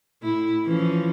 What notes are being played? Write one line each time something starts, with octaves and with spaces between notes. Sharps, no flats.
A2 E4
E3 F3 C#4